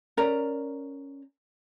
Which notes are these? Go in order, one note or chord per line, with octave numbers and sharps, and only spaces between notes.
C#4 A#4 D5 A#5